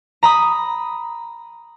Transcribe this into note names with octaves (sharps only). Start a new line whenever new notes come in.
A#5 B5 D#6